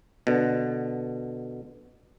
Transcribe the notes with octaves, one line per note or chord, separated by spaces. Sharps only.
B2 D3